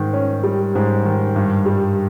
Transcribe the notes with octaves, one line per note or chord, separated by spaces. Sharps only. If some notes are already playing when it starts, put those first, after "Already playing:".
Already playing: G#2 D#3
C#4
G3
G#2
D#3
G2
G3